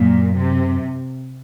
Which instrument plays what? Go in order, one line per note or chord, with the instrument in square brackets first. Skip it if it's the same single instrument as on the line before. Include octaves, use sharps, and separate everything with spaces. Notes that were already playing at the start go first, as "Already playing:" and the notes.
Already playing: [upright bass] F#2 [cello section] A#2
[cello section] C3